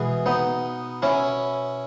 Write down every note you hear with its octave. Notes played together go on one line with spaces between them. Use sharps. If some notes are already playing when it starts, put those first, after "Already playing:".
Already playing: B2 E3 G#3
B3 D#4
C#4 E4